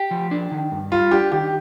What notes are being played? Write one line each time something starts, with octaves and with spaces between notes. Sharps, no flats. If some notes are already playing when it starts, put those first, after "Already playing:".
Already playing: G4
F3
D4
D#3
G2
G3 F4
D4 G4
D#3 G4